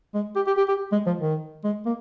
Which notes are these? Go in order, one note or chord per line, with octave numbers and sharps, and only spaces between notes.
G#3
G4
G4
G4
G4
G#3
F3
D#3
G#3
A#3